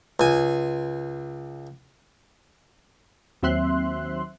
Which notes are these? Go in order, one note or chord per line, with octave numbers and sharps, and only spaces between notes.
C#2 G#5
D#2 F#3 C4 E5 C6 F#6